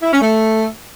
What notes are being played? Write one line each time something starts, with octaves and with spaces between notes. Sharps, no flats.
E4
C#4
A3